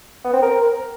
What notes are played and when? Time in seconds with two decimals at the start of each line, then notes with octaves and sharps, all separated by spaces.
0.24 B3
0.33 C4
0.42 A#4